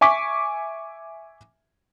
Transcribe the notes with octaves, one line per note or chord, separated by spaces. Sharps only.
E5 G#5 C#6 D6 B6